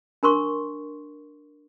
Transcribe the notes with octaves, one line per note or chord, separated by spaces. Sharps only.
D4 A#4 C6 C#6